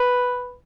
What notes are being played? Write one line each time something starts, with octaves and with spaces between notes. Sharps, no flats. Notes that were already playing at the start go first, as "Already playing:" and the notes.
Already playing: B4